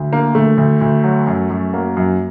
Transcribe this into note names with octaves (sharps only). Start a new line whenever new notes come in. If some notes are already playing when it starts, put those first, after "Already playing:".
Already playing: D2
D3 A#3
D2 A3
D2
D2
F#3
F#2
F#2
F#3 A#3
F#2